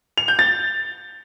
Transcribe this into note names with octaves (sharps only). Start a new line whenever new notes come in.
F7
G6
A6